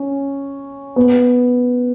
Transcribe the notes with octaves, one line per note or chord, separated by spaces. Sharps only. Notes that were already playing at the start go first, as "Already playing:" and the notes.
Already playing: C#4
B3